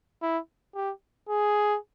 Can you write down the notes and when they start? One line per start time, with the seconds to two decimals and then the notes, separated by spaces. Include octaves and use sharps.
0.22 E4
0.75 G4
1.29 G#4